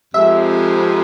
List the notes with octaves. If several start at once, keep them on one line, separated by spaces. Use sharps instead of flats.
F2 C3 F3 G#3 E5